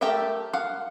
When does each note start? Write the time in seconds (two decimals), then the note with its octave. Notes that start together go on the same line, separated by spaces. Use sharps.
0.01 A3 G4 A4 A#4 E5
0.53 F5 F#5